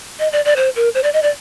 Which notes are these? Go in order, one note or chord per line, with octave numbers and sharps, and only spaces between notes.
D#5
D5
D5
C5
A#4
C5
D5
D#5
D5